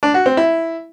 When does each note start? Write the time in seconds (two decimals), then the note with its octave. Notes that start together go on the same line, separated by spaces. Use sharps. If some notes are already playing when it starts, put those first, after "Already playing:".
0.03 D4
0.14 F#4
0.26 C4
0.37 E4